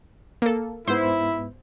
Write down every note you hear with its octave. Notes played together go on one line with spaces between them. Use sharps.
A#3 A4
G#2 B3 E4 C5